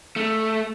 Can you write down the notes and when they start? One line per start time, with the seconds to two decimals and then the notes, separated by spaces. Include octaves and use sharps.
0.16 A3